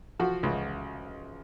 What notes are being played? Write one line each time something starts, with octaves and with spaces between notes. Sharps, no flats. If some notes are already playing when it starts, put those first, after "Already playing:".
F3 F#4
C#2